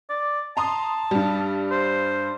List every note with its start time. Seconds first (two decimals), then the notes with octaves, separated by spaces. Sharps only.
0.09 D5
0.57 A5 A#5 C6 D#6
1.11 G2 G3
1.71 C5